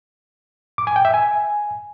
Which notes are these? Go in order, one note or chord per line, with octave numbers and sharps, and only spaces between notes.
D6
G#5
G5
E5
G#5